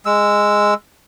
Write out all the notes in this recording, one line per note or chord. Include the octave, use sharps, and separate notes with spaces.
G#3 E6